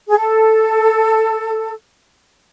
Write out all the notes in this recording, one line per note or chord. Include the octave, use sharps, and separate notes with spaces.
G#4
A4